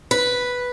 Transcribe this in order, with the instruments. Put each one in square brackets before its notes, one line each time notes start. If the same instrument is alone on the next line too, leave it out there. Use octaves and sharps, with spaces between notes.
[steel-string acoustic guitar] B4